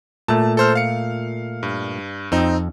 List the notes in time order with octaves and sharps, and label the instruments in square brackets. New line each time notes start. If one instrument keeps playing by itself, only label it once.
[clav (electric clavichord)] A#2 A3 [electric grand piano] A5
[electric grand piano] A4 C5 F6
F5 C#7
G2
[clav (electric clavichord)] F2 [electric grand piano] C4 D#4